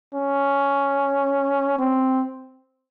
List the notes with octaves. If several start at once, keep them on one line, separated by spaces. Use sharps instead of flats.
C#4
C4